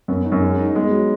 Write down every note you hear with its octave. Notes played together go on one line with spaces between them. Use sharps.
F#2 B3
D#4
F#2
G#3
D#4
G#3 B3
F#3